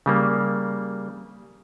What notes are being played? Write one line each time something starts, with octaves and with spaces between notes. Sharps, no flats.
C#3 G3 A#3